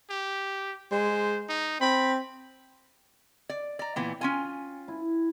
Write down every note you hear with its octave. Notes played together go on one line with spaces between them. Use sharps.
G4
G#3 C5
D#4
C4 B5
D5
D5 A#5
A#2 E3 B3 G5
C#4 F4 G#5
E4